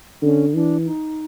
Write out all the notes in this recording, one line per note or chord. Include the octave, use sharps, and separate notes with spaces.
D3 C#4
E3 D4
D#4